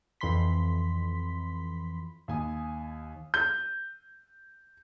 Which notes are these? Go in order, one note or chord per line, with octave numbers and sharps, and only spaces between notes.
F2 E3 B5 C6 B6
D#2 G#5 D#6
G6